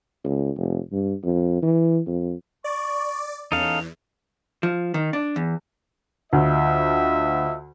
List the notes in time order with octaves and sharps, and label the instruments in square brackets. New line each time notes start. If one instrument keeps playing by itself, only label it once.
[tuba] C#2
F1
G2
F2
E3
F2
[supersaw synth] D5 [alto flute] C#6
[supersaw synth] E2 [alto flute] C#4 [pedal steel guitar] D#4 A4 F5 [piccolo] F7
[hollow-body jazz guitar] F3
D#3
D4
E2
[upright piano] D2 [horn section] F4 D#5 E5